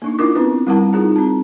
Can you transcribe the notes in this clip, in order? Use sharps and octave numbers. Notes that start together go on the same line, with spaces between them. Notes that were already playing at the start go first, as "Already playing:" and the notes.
A#3 D4 D#4
D4 E4 F4 A#4 D6
B3 C4 D4 E4 B4
G3 C4 E4 A#4 F#5 A5
D#4 F4 G#4 A#5
C4 A5